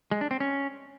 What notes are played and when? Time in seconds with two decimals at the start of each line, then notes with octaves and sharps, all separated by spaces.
0.11 G#3
0.21 D4
0.31 C4
0.40 C#4